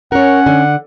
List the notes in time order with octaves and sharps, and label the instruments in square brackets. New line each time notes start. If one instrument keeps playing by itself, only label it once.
[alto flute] C#4 [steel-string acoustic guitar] A#4 C#5 [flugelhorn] F#5
[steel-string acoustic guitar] D3